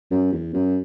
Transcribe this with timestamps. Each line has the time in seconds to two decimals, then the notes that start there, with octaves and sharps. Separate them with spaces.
0.11 F#2
0.32 E2
0.54 F#2